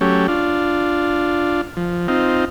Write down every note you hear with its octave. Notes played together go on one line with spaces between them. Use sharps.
F#3 A3 C#4 G4
D4 F4
F3
C4 D#4 F4